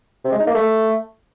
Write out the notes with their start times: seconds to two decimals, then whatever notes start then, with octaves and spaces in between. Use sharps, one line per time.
0.25 C3
0.32 G#3
0.40 D#4
0.47 A#3
0.55 A3